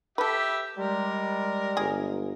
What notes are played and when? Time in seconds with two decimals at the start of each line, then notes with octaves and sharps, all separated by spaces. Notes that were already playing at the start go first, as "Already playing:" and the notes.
0.18 G4 A4 B4 E5
0.77 G3 G#3 A#4
1.77 G1 G#4